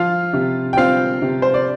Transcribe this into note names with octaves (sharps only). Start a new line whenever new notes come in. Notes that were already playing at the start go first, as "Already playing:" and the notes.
Already playing: F3 F4 F5
C3
G5
C4 F4 F5
C3
C5
D5